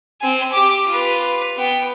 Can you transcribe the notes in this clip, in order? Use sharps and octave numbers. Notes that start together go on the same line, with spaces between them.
C4 G#5
G4 D6
F4 B4
B3 G5